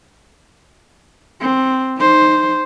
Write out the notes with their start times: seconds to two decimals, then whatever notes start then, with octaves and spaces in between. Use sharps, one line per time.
1.41 C4
1.97 D#4 C5